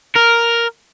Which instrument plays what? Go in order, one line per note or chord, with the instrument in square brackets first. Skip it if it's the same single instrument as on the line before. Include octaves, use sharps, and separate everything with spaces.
[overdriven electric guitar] A#4